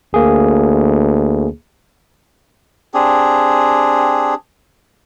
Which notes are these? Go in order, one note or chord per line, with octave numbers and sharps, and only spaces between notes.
D2 A#3 G#4
C4 D4 G4 G#4